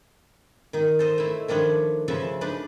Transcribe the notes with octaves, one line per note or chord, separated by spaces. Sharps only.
D#3 D#4
A4 C5 D#5
A3 E4
D#3 F3 D4 B4 C#5
C#3 F3 B4 E5
D4 D#4 B4